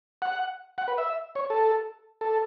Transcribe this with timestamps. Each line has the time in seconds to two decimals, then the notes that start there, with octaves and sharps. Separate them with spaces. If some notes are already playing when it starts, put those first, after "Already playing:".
0.22 F#5
0.78 F#5
0.88 B4
0.98 E5
1.35 C#5
1.50 A4
2.21 A4